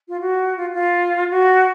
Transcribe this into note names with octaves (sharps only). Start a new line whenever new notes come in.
F4
F#4
F4
F4
F#4